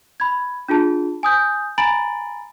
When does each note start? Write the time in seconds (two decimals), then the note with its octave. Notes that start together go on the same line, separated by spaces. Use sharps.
0.20 B5 G#6
0.68 D4 F4 G#4 A5
1.23 G#5 D#6 G6
1.78 G#5 A#5 B5 A6 D7 F#7